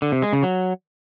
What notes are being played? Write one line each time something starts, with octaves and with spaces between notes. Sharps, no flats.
D3
C3
G#3
C#3
F#3